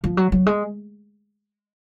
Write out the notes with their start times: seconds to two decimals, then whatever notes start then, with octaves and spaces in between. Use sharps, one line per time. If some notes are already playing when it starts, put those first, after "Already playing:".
0.04 F3
0.17 F#3
0.32 F#3
0.46 G#3